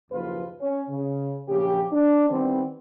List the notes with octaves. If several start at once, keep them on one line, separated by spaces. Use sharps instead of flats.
F#1 D#2 F3 F4 B4
C#4
C#3
A#1 C#3 F#3 G4
D4
D#3 E3 G3 B3 C4